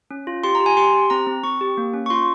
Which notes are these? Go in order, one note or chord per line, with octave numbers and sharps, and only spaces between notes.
C#4
F4
G4 C6
A#5
G4
G#5
G4 C6
G4
C4 A#5
C4
C4 C#6
G4
A#3
C#4
C#6
F4 C6